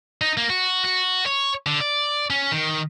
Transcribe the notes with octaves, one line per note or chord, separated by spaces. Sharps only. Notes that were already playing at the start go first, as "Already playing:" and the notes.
D#4
A#3
F#4
F#4
C#5
D3
D5
C#4
D#3